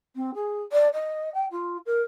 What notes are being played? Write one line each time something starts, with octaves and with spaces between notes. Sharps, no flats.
C4
G#4
D5
D#5
G5
F4
A#4